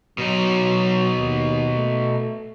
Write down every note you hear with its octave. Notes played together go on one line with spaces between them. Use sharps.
B2 F#3 D#4
D#2
A3